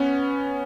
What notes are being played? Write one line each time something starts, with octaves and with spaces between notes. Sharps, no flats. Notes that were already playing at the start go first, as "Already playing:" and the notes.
Already playing: B3 C#4